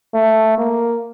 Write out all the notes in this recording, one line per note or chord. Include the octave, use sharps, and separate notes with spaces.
A3
A#3